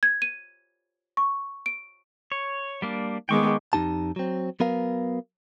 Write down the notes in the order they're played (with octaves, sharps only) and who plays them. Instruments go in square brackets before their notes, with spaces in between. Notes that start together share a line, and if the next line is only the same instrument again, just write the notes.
[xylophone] G#6
D#7
C#6
D7
[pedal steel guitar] C#5
G3 A#3 D4
[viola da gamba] D#3 G#3 B3 [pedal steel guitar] G5 C#6 D6
[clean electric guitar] F2 G#2 D#4 G4 A5
F#3 C4
F#3 B3 A#4 F5